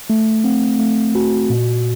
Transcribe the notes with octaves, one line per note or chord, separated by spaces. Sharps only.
A3
C4
A3
F#4
A#2